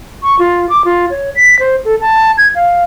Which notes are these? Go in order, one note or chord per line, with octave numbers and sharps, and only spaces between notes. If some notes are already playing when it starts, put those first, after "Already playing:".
C#6
F4
D6
F4
C#5
B6
C5
A4
A5
G#6
F5